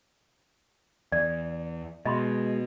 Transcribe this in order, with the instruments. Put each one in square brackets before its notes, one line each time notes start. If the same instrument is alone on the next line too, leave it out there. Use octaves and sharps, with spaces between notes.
[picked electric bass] E2 [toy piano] D5
[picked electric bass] B2 [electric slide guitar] G#3 [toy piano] D#5 B5 C6